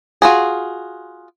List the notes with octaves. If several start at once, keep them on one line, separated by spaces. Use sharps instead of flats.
F4 F#4 G#4